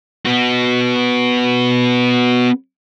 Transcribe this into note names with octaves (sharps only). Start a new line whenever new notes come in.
B3 F#4